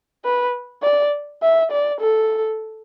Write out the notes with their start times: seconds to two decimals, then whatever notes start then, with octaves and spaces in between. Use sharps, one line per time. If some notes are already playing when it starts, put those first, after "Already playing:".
0.25 B4
0.83 D5
1.42 E5
1.72 D5
2.01 A4